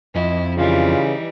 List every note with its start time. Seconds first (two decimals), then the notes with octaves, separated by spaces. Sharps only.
0.16 F2 E4 D#5
0.57 C#3 E3 G3 D#4 F4